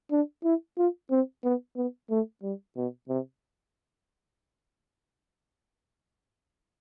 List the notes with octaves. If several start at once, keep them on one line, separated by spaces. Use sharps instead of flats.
D4
E4
F4
C4
B3
B3
A3
G3
B2
C3